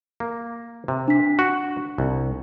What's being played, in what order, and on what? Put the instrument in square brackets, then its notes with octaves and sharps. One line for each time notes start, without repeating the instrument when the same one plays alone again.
[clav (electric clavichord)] A#3
C3
[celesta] D4 B6
[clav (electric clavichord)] F#4
C2